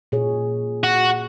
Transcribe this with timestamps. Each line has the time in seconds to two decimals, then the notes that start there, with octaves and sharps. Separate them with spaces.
0.12 A#2 G#4 C#5
0.84 F#4